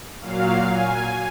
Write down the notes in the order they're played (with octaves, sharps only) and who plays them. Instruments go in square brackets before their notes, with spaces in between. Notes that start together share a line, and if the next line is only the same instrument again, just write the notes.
[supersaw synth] A#2 F#3 F5
G#5